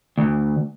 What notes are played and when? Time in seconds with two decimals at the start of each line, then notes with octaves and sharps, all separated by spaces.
0.18 D2